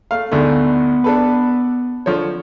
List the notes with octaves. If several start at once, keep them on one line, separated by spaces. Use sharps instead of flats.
A3 F5
D2 G#2 A3 B3
D4 A4 B4
D3 F3 C#5